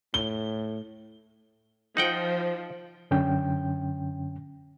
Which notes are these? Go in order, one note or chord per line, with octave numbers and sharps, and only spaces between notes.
A2 G7
F3 D#4 F#5 G5
F#2 D3 C#4 G5